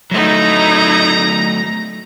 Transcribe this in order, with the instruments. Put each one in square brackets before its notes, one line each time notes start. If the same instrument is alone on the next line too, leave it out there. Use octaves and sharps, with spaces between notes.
[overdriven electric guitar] F#3 A3 [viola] D#4 E4 [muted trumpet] A#5